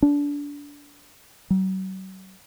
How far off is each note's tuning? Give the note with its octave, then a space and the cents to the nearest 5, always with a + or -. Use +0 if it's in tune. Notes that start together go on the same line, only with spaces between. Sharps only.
D4 -25
F#3 +40